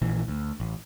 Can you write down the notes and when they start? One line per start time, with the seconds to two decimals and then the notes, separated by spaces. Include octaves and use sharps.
0.02 A#1 A#2 E3
0.28 D2
0.60 A1